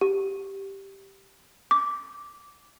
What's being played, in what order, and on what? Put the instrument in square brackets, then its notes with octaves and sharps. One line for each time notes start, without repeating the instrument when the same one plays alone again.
[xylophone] G4
D6